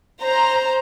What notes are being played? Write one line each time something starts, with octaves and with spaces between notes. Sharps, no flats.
C5 A#5